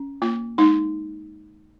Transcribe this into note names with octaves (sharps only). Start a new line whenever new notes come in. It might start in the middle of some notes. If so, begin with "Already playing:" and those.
Already playing: C#4
A#3 F4
G#3 D#4